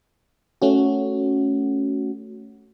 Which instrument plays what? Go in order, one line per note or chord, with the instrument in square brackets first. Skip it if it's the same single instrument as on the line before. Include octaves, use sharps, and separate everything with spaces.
[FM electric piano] A3 C#4 F#4